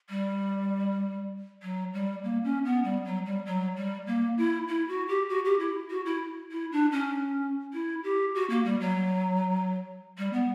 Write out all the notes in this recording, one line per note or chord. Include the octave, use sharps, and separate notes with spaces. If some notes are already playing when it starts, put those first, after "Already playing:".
G3
F#3
G3
A#3
C#4
B3
G3
F#3
G3
F#3
G3
A#3
E4
E4
F#4
G4
F#4
G4
E4
F#4
E4
E4
D4
C#4
E4
G4
F#4
A#3
G3
F#3
G3
B3